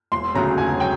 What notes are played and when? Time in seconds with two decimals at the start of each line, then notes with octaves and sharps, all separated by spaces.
0.12 E1 C6
0.35 D2 C#3 F#3 A#5
0.58 E1 G#5
0.80 F#3 G5